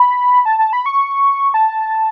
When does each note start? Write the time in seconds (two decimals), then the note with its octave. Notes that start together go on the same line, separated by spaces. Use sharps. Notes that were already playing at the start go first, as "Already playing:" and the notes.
Already playing: B5
0.45 A5
0.59 A5
0.73 B5
0.86 C#6
1.54 A5